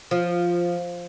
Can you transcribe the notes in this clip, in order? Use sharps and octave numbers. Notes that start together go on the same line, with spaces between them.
F3